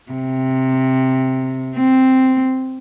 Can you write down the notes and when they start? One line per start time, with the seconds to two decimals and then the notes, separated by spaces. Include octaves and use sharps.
0.12 C3
1.77 C4